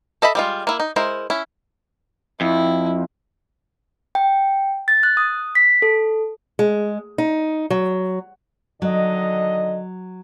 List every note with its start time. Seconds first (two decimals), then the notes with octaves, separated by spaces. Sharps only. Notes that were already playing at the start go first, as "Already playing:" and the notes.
0.22 A4 D#5 E5 B5
0.35 G3 G#3 F4
0.67 A#3 E4
0.80 D#4
0.96 G#3 E4 A#4 C5
1.30 C#4 E4
2.41 F2 E4
4.15 G5
4.88 A6
5.03 F#6
5.17 D#6
5.55 B6
5.82 A4
6.59 G#3
7.18 D#4
7.70 F#3
8.82 D3 D#3 F#3 D#5